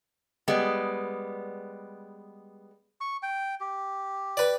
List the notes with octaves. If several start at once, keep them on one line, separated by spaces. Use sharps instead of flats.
G3 G#3 B3
C#6
G5
G4
B4 D5